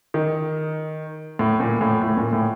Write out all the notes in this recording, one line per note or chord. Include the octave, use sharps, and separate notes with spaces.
D#3
A2
A#2
A2
A2
A#2
A2